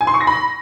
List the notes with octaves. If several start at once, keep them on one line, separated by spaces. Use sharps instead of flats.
G#5
C6
C#6
A#6
B5